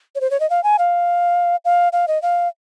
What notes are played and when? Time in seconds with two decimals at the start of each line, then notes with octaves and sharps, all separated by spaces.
0.15 C#5
0.21 C5
0.31 C#5
0.40 D#5
0.50 F5
0.64 G#5
0.79 F5
1.65 F5
1.93 F5
2.08 D#5
2.22 F5